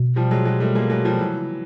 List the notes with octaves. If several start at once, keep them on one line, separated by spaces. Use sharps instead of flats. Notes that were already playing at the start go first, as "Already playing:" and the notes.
Already playing: B2
F3 G3
F#3 G#3
F#3 G#3
G3 A3
G#3 A#3
F#3 G#3
F3 G3
C3 E3 F#3
C#3